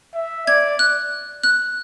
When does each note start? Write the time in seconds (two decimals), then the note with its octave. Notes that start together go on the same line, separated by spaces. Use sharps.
0.15 E5
0.47 D5 G#6
0.79 F#6
1.44 F#6